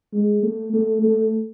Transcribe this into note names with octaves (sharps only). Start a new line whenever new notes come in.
G#3
A3
A3
A3